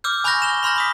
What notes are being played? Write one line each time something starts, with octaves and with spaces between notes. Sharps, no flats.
D6 E6 F6 G6
G#5 B5 C#6 F#6 G6 A#6
E7 G7
B5 C6 F6 G6 A#6
B5 D#6 B6